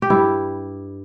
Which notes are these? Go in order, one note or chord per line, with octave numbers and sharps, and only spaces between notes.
G4
G2 G3 E4